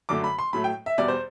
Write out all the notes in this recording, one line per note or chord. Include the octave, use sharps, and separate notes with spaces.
F#2 D3 F#3 A3 D6
B5
C6
A2 F#3 A3 B5
G5
E5
E2 B2 G3 D5
C5